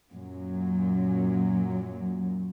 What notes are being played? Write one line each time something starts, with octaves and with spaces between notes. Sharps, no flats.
F#2 A#2 F#3